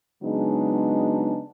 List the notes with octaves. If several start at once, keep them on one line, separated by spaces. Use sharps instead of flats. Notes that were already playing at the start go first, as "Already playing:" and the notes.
C#3 F#3 G#3 B3 D4 D#4